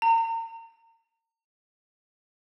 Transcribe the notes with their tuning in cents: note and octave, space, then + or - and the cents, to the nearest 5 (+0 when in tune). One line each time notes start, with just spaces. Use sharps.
A#5 -35